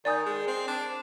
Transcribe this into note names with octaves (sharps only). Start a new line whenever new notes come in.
D#3 D5 G#5 D#6 G6
G#3
C4
D4